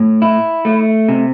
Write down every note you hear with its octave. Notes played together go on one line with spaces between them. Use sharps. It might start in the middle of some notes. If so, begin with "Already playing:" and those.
Already playing: A2
E4
A3
C3